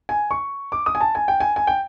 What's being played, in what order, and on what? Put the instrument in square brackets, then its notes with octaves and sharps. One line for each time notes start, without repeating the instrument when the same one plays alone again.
[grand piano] G#5
C#6
D6
D#6
G#5
A5
G#5
G5
G#5
G#5
G5